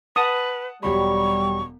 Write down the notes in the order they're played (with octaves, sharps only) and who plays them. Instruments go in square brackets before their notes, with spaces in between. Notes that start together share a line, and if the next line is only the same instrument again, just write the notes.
[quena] B4 [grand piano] F#5 A5 [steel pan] D#6
[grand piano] E1 F#3 B5 [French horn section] G3 [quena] C#6